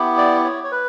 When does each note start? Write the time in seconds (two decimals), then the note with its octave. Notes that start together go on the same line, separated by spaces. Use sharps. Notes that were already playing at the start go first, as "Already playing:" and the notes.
Already playing: B3 E4 G4
0.18 D5
0.44 C#5
0.64 C#5
0.72 B4